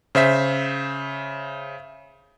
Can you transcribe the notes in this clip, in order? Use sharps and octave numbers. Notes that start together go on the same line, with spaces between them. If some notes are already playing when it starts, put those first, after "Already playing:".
C#3 C5 E5 B6